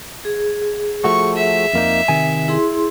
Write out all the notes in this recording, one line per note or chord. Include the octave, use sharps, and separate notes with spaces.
G#4
F3 A3 F#4 C#6
E5
F2 A#3 D#4
C3 D#3 G#5
E4 G#4 C6